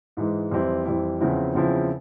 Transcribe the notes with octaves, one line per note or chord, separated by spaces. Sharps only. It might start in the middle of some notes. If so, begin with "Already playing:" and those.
G#2 E3 G#3
F2 E3 G3 C4 E4
F2 E3 G3 C4 E4
E2 C#3 F3 C4 E4
E2 C#3 F3 C4 E4